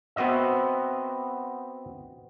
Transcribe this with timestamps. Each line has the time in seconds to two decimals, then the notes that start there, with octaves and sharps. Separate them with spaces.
0.16 B3 C4 F#4 D#5 E5